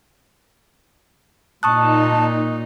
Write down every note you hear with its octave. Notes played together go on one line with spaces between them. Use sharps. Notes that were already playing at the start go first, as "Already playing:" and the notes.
A#2 D#4 A5 C#6 D#6 F#6